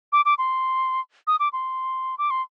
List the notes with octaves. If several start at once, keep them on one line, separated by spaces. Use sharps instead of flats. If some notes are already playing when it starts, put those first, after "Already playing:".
D6
D6
C6
D#6
D6
C6
D6
C6